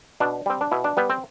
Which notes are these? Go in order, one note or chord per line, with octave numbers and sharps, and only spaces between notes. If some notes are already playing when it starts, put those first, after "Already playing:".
B2 D4
G3 C4
D4
B2 E4
D4
G3 B3
C4